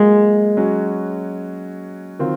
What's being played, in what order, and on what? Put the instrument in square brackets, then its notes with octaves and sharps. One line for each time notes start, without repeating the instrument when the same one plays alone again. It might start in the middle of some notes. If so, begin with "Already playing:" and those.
Already playing: [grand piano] F#3 A#3 F4 [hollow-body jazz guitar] G#3
[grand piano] F#3 C#4 F#4
D#3 F#3 C4 F4